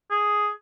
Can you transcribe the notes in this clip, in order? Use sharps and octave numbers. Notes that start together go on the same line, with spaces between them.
G#4